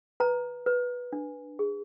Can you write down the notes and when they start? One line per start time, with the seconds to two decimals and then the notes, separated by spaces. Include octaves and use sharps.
0.20 B4 A#5
0.66 B4
1.13 D4
1.59 G#4